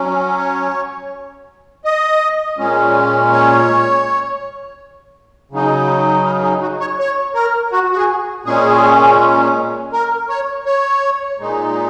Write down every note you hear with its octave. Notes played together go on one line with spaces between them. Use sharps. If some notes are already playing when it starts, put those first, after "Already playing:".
Already playing: F#3 C#4
C#5
D#5
A#2 G#3 C#4
C#5
C#3 F#3 D#4
A#4
G#4
F#4
C#5
C#5
A#4
F#4
F#4
G#4
A#2 G#3 C#4 G#4
A#4
C#5
C#5
A#2 G#3 D#4